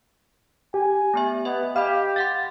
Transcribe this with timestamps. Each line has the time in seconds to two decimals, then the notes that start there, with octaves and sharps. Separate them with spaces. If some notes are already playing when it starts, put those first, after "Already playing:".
0.74 G4 G#5
1.14 A3 B3 E5
1.45 B3 D#5 E5
1.76 G4 D#5 F5 B5
2.16 F5 F#5 C6 A6